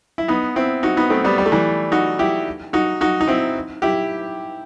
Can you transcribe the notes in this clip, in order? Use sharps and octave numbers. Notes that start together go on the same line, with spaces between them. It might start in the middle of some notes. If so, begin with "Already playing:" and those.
E4
B3 D#4
C4 E4
D#4 F#4
B3 D#4
A3 C4
G3 B3
G3
A3
E3 G3
D#4 F#4
E4 G4
D#4 F#4
D#4 F#4
D#4
C4 E4
E4 G4